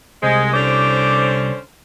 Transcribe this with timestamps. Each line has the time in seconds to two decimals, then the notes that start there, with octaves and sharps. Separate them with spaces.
0.23 C2 G#3 C5
0.54 D3 C#4 C5 D6